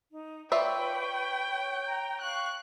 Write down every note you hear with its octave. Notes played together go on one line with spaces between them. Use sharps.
D#4
F4 B4 C#5 D5 E5 G5 C#6
A#5
F5 G5 C#6 F#6